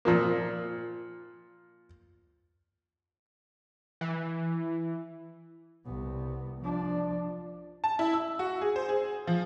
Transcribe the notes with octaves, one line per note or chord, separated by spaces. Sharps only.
A#2 F3 A#3
E3
C2 B3
F3 D4
A5
E4
E6
F#4
G#4
C5
G#4
F3